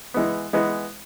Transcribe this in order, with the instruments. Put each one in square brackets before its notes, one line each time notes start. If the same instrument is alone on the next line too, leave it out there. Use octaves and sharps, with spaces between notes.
[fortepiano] E3 G#3 B3
E3 G#3 B3